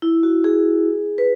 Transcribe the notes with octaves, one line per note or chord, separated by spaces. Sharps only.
E4
F#4
G#4
B4